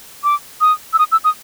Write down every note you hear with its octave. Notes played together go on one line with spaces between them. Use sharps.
D6
D#6
E6
D#6
E6
D#6